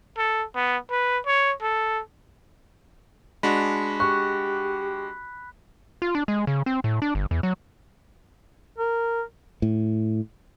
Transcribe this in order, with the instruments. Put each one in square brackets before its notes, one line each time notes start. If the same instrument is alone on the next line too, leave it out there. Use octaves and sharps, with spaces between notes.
[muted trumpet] A4
B3
B4
C#5
A4
[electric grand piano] G#3 D4 F#4 [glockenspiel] B5 B6
[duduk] G4 [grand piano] C#6 [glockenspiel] F#6
[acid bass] F4
D4
G#3
C#3
C4
A2
D4
G1
E2
F#3
[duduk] A#4
[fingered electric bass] A2